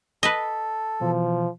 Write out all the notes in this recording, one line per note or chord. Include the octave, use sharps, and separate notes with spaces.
A4 B4 D#5
B2 E3 F3